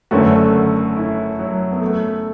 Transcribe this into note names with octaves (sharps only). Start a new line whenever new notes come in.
F#1 F#2 D3 A3 F#4
E4
F#3
B3
A3